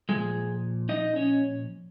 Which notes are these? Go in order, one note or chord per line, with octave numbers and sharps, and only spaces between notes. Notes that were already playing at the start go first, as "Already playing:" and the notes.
A#2 F3 G#3 G#4
D#4 D#5
C#4 C#5